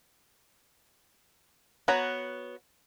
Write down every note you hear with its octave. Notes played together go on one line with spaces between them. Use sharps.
B3 F#4 C#5 A#5